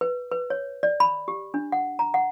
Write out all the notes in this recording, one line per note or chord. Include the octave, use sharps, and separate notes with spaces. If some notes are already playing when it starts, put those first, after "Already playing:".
B4
B4
C#5
D5
B5
G4
D4
F#5
A#5
F#5